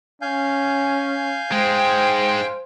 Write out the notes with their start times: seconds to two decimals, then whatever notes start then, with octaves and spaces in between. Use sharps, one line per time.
0.22 C#4 F5 G#5 G6
1.51 G#2 G#3 C5 G5